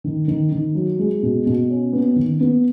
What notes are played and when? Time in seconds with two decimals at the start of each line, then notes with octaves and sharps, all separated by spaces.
0.04 D#3
0.28 D#3
0.52 D#3
0.75 F#3
0.99 G#3
1.23 B2
1.46 B2
1.70 C#4
1.93 B3
2.16 D#3
2.40 B3